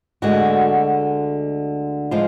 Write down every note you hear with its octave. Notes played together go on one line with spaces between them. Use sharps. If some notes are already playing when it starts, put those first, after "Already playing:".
D2 D3 G#3 F#4
F3 G#3 F4